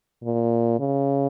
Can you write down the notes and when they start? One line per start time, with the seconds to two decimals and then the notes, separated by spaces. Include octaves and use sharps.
0.24 A#2
0.80 C#3